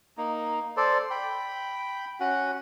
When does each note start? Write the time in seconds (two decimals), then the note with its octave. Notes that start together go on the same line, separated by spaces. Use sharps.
0.17 A#3 D#4
0.77 A4 C5 D5
1.11 G5 B5
2.20 C#4 F#4 F#5